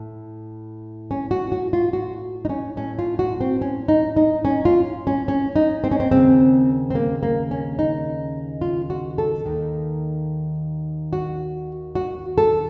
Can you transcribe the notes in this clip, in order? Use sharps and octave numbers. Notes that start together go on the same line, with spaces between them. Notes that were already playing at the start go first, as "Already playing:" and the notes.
Already playing: A2
C#4
F#4
F#4
F4
F#4
D#4
C#4
A2 C#4
F4
F#4
C4
C#4
D#4
D#4
C#4
F4
C#4
C#4
D#4
C4
C#4
C4
D#2 C#3 C4
C4
A#3
A#3
C#4
D#4
F4
F#4
A4
D#2 D#3
F#4
F#4
A4